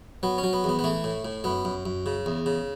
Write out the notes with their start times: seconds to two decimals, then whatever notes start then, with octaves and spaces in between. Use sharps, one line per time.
0.23 F#3 B3
0.38 C#4
0.44 F#3
0.53 B3
0.64 E2 B3
0.79 B3
0.84 E3 A3
1.04 A2
1.25 A2
1.44 F#2 B3
1.65 F#2
1.86 F#2
2.06 C#3
2.26 E2
2.46 C#3